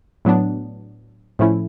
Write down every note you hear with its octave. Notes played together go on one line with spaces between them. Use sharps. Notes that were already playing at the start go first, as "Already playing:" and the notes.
A2 F#3 B3 D4
A2 F3 A3 C#4 E4